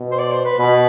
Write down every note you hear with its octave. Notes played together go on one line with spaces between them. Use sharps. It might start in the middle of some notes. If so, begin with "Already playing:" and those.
Already playing: B2
C5
D5
C5
B4
B2 B4